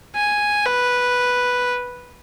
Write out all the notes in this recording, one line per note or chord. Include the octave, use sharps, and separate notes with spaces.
G#5
B4